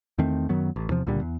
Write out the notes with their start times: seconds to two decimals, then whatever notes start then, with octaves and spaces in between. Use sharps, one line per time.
0.18 E2 D#3 A3 C4
0.49 F#2 D#3 F#3 B3
0.76 A1
0.89 E2 C3 F3
1.07 C#2 A#2 D3 G3
1.21 E2